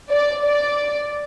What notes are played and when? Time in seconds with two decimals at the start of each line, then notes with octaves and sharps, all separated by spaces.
0.11 D5
0.45 D5